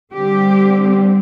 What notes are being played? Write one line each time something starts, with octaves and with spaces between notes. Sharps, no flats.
D3 G3 C4 G4